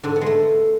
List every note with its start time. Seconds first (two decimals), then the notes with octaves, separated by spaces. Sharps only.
0.03 G#2 D3 D4
0.16 B3
0.21 G#3 A3